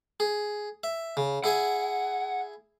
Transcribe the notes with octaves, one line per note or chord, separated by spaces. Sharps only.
G#4
E5
C#3
E4 G#4 F#5 G#5